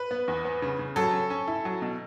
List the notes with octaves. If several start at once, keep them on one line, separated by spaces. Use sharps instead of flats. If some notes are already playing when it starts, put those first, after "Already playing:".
Already playing: B4
B3
E2
B3
C#3
C#3
F#3 A4
C#4
C#4
E4
F#3
B2